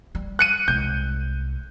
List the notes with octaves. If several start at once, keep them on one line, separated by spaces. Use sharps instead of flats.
G3
F#6 C#7 D#7
C2 G#3 G6